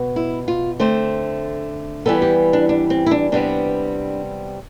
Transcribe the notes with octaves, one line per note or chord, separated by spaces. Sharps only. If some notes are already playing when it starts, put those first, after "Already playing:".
Already playing: B2 B3
E4
F4
D3 A3 C4 C5
E3 G3 B3 A4
G4
D4
D4
C4
E4
D4
C3 G3 B3 D4